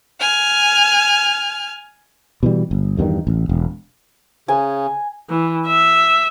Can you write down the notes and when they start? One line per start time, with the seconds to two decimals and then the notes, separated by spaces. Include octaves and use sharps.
0.20 G#5 F6
2.43 B2 E3 G3
2.71 G1
2.97 E2 G2 B2 D#3
3.27 A1
3.49 E1
4.48 C#3 G#5
5.30 E3
5.67 E5